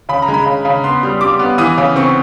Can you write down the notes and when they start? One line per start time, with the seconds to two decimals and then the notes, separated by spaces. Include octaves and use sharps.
0.09 C#3 B5
0.22 A#5
0.28 G#3
0.34 B5
0.46 C#3
0.65 C#3
0.84 B3 C6
1.03 G3
1.21 G3 D6
1.39 B3
1.58 E3 D#6
1.77 C#3
1.96 C4 C#6